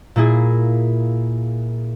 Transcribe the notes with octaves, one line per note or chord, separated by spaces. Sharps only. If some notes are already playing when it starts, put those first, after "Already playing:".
A#2 A#3 E4 G#4